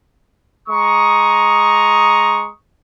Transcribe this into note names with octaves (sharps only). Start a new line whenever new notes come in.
G#3 A#5 C#6 D#6